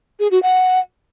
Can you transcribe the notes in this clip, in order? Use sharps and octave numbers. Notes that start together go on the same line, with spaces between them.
G#4
F#4
F#5